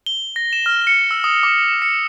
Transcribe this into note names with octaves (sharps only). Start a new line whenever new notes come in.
G7
A#6
E7
F6
C#7
E6
D#6
D6
C#7